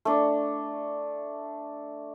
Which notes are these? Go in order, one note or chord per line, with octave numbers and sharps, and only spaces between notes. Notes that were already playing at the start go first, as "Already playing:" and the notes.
A3 D4